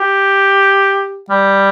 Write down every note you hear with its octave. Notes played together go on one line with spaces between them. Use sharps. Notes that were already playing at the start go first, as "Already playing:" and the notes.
Already playing: G4
G3